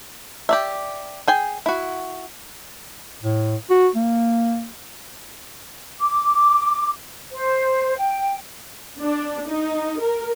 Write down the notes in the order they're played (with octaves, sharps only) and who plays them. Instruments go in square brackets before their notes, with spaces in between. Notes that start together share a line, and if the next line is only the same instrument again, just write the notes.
[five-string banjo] G4 D5 E5
G#4 G5 G#5
E4 F#4
[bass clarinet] A2
F#4
A#3
[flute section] D6
C5
G5
[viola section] D4
D#4
A#4